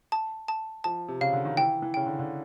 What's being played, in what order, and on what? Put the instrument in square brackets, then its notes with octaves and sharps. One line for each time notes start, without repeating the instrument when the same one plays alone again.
[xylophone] A5
A5
[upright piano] F3 [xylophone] A5
[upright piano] C3
[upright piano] C#3 [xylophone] F5
[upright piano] D3
D#3
[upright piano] E3 [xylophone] G5
[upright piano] E3
[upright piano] C#3 [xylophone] G5
[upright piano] D3
D3